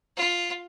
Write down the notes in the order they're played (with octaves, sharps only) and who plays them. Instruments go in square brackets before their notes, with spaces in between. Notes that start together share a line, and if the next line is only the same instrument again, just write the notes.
[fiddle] F4